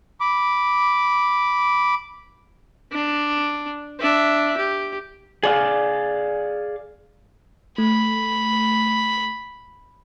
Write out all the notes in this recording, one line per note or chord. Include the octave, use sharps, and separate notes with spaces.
B5 D6
D4
D4 E5
G4
G#4 D5 F5
A3 B5